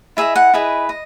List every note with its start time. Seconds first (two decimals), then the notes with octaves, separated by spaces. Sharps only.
0.17 E4 G#4 B4 D#5 E5
0.36 F#5
0.54 E4 G#4 B4 D#5
0.89 D#5